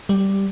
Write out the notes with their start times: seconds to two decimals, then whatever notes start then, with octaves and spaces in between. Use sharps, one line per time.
0.09 G3